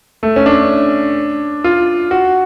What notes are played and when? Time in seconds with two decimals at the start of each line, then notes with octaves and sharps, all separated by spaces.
0.23 A3
0.36 C#4
0.46 D4
1.64 F4
2.11 F#4